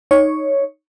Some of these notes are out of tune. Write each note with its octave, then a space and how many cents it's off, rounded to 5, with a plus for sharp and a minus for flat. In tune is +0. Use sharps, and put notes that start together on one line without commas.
D#4 +0 C#5 +0